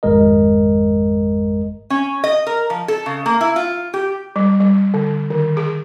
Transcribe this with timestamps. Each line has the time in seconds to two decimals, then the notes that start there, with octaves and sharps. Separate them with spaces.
0.03 G#1 F2 G#3 A#4 D#5
1.90 C#4
2.24 D#5
2.47 A#4
2.70 F3
2.88 A4
3.06 C#3
3.26 A#3
3.41 E4
3.56 F4
3.94 G4
4.36 G3
4.60 G3
4.94 D3
5.30 D#3
5.57 G#4